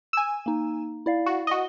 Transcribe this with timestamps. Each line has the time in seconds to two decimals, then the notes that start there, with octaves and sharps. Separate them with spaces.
0.13 G#5 E6
0.46 A#3 D#4
1.06 E4 D5 F5
1.26 F#4
1.47 F#4 D#5 G7